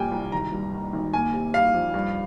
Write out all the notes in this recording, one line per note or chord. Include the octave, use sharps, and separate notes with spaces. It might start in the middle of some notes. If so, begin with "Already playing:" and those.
Already playing: A#1 A#2 G3 A#3 G5 G#5
C2
G#1 A#5
G2
D#3
G#1
A#3 G#5
C3
G3 F5
F2
G2